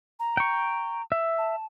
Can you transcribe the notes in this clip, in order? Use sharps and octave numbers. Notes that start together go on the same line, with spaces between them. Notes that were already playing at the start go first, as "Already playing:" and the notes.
A#5
G5 C#6
E5
A5